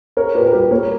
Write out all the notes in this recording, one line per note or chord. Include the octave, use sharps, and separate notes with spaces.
C#4 A#4 C#5
A#2 G4 B4
A#4
G3 G4 B4
A#3 A#4 C#5